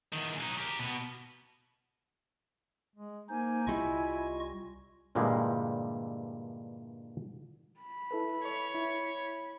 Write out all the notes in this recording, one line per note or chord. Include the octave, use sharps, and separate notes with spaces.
E2 D#3
F#3 D#4
G4 A#4
B2 B3
G#3
A#3 D#4 C5 G#5
C2 G3 E4 F4 D#5 C#6
G2 A#2 D3 E3 G3 G#3
B5
E4 A4 B4
C#5
E4